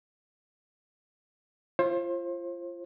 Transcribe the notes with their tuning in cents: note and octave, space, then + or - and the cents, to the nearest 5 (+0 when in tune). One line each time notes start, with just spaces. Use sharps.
F4 -25 C5 +30